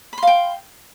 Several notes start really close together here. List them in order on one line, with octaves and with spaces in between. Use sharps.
B5 C6 F5 G5